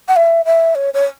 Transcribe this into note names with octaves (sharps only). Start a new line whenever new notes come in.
F#5
E5
E5
C#5
C#5